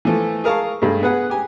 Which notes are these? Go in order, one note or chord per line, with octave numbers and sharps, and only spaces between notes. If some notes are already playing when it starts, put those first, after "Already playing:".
E3 F3 A3 A4
G#4 A#4 F5 A5 C#6
G2 G#3 A3
B3 G#4 B4 F#5
G4 G#5